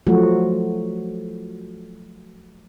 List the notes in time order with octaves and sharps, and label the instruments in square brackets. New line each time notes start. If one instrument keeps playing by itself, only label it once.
[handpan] F3 F#3 A3 F#4